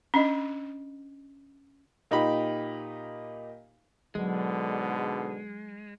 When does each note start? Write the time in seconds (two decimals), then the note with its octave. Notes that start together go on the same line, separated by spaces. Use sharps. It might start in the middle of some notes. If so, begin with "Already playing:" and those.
0.14 C#4 D4 D#5
2.11 A#2 D#4 G4 B5
4.15 G#2 B2 D3 F#3 G#3